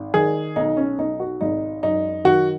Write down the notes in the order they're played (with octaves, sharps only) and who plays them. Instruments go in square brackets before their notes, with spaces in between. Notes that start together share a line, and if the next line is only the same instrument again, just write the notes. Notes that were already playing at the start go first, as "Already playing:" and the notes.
Already playing: [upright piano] G#1
D#3 G#4
B1 D#4
C#4
B1 D#4
F#4
G#1 D#4
F#2 D#4
D#3 F#4